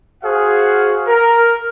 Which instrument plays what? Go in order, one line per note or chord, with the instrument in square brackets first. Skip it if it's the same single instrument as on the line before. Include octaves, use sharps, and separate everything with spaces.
[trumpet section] F#4 G#4 C5 F5 F#5
A#4